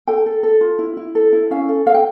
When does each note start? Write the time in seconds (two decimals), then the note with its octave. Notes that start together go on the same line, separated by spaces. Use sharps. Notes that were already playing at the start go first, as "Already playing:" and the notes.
0.07 A4 G5
0.26 A4
0.43 A4
0.61 F4
0.79 E4
0.97 E4
1.15 A4
1.33 E4
1.51 C#4 F5
1.69 A4
1.86 A4 F5
1.94 G5